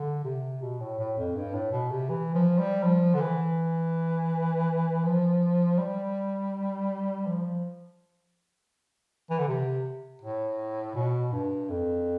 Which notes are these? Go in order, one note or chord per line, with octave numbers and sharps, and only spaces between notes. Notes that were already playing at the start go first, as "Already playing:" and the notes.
Already playing: D3
C3
B2
A2
A2
F2
G2
A2
B2
C3
E3
F3
G3
F3
D3
E3
F3
G3
F3
E3
D3
C3
A2
B2
G2
F2